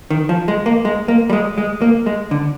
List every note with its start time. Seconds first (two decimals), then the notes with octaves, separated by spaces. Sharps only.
0.10 D#3
0.29 F3
0.48 G#3
0.66 A#3
0.85 G#3
1.08 A#3
1.30 G3
1.33 G#3
1.58 G#3
1.82 A#3
2.06 G#3
2.31 D3